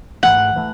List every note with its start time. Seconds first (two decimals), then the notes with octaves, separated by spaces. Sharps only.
0.23 G#2 E3 A3 F#5
0.56 E3 A3